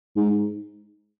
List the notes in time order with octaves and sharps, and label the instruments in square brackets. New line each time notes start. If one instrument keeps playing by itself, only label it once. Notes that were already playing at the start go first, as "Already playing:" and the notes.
[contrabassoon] G#2